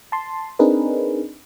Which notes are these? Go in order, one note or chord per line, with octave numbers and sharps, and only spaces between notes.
A5 C6
C4 D4 D#4 G#4 A#4 B4